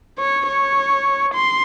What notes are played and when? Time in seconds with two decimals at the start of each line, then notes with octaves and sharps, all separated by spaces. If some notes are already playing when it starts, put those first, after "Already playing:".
0.18 C#5
0.48 C#5
1.34 C6